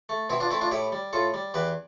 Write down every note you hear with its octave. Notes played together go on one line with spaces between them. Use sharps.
A3
B2 C4 E4
D4 F4
A3 C4 E4
D4 F4
A2 E4 G4
G3
A2 F4 A4
G3
E2 G4 B4